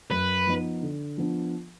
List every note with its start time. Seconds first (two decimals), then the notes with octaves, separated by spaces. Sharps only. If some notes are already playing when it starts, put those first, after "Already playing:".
0.11 F#2 B4
0.47 F3 B3 D#4
0.83 D3
1.18 F3 B3 D4